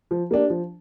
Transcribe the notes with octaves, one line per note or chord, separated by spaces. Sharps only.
F3
A#3 D4 G4
F3